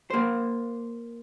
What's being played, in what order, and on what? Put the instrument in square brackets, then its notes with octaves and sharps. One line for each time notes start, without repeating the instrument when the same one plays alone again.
[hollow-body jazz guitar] A#3 C5